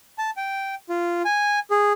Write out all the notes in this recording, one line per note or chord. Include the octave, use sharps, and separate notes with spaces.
A5
G5
F4
G#5
G#4